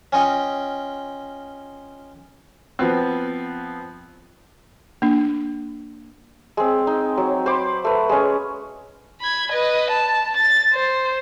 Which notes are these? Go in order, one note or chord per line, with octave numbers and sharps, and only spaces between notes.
C#4 F4 D#5 G5
F3 B3 C4
A#3 D4
G#3 C4
D#4
F#3
C5 B5 C6 D6
A3 B4
G#3 C#4
B5 G#6
B4 D#5
A5
A6
C5